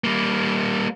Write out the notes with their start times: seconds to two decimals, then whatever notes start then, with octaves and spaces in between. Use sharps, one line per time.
0.04 G3 A#3